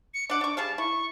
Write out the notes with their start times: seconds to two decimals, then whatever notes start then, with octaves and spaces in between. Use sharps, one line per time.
0.14 C#7
0.30 D4 F#5 D6
0.41 D4 C#6
0.57 G3 G#4 F5 A5
0.78 E4 C#6